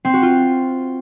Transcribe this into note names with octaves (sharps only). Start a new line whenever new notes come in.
C4
F#4
F4